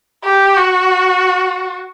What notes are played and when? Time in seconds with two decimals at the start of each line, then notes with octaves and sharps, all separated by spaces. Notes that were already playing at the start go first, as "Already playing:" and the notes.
0.25 G4
0.57 F#4